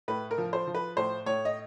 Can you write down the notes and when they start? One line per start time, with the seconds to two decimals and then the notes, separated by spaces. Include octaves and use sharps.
0.08 A2 B4
0.31 A#4
0.38 F3
0.53 C5
0.67 F3
0.75 B4
0.97 A2 C5
1.26 A2 C#5
1.45 D#5